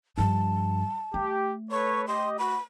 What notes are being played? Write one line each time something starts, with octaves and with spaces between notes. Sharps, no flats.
G2 F3 A5
A3 G4
A4 B4 C#5 C#6
G4 D#5 C6
F#4 B5